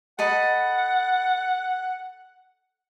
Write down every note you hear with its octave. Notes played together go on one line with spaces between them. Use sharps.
A4 D#5 F#5 B5